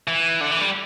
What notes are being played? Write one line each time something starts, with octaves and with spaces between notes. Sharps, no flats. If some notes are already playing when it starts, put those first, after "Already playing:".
E3
D3
E3
G3